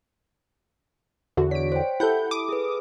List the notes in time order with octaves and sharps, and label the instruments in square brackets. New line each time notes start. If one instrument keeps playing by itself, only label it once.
[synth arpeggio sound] E2 D3 F#4
[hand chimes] C#5 D5 [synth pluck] B6 D7
[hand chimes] C5 G5
[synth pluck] E4 G4 A4 [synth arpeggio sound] F#5 G6 [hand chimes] B5
[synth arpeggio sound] D6 D#6
[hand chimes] G#4 B4